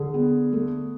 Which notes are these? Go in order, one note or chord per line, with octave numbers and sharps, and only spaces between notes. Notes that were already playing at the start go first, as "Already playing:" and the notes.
Already playing: D3 G#4
B3
A3